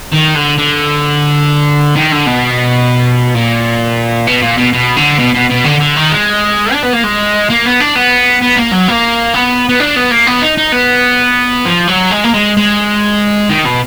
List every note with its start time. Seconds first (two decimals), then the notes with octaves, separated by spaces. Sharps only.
0.12 D#3
0.35 D3
0.58 D3
1.96 D#3
2.12 D3
2.27 B2
3.35 A#2
4.27 B2
4.42 A#2
4.58 B2
4.73 B2
4.97 D3
5.19 B2
5.35 B2
5.50 B2
5.65 D3
5.81 D3
5.97 D#3
6.12 G#3
6.73 D4
6.83 B3
6.93 A#3
7.04 G#3
7.50 A#3
7.65 B3
7.80 D4
7.96 B3
8.42 B3
8.57 A#3
8.73 F#3
8.89 A#3
9.34 B3
9.69 B3
9.80 D4
9.96 B3
10.11 A#3
10.27 B3
10.42 D#4
10.58 D#4
10.72 B3
11.65 F3
11.88 F#3
12.11 G#3
12.24 A#3
12.34 G#3
12.57 G#3
13.50 D#3
13.65 B2